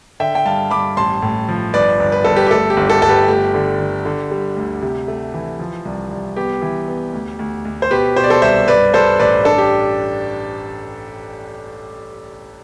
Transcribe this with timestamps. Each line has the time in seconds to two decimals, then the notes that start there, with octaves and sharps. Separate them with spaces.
0.20 D3 E5 G5
0.35 G5
0.46 G2 F5 A5
0.71 G2 B5 D6
0.97 A1 A5 C6
1.22 A2
1.48 F3
1.74 G1 B4 D5
2.00 G1
2.12 B4
2.25 G1 A4
2.36 G4 B4
2.47 G4
2.51 A3 A4
2.70 G4
2.77 G1
2.90 A4
3.02 G1 A4
3.09 G4 B4
3.28 A3 G4
3.54 D3
3.80 D3
4.05 D3
4.31 G3
4.56 D2
4.82 C3
5.08 A3
5.34 E3
5.59 F3
5.85 C2
6.11 C2
6.36 B3 G4
6.62 E3
6.88 B3
7.14 D2
7.39 D2
7.65 D2
7.82 C5
7.91 B2 G4 B4
8.16 B2 C5
8.24 D5
8.30 A4 C5
8.42 C2 C5 E5
8.68 G2 B4 D5
8.94 G2 A4 C5
9.19 A1 B4 D5
9.45 D4 A4
9.58 G4